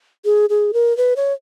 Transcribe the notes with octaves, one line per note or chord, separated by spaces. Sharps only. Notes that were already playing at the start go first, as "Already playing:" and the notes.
G#4
G#4
A#4
B4
C#5